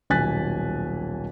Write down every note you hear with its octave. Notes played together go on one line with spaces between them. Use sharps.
D#1 B1 G#5 F#6 A6 B6